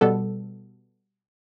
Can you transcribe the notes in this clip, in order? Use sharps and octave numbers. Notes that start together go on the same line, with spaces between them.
B2 G3 B3 A4